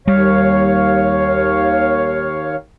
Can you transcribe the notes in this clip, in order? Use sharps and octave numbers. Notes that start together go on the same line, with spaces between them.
D#2 G3 C#5 F5